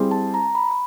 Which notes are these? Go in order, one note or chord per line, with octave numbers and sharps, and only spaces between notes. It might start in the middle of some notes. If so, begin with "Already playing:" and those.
Already playing: G3 C4 E4 G#4
A5
A#5
B5
B5